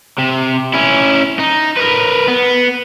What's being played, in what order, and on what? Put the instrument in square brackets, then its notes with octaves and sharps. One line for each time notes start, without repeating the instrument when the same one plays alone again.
[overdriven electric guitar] C3
C#4 E4
D#4
A#4 B4
B3